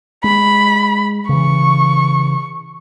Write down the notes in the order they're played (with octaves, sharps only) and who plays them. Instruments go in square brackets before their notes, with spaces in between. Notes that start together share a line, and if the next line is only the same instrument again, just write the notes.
[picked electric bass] G#3 [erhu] B5
[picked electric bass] C#3 E3 [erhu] C#6